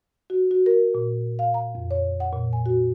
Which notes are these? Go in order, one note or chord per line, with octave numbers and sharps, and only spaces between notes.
F#4
F#4
A#4
A#2
F5
A#5
F2
C#5
F#5
A#2
G#5
F#4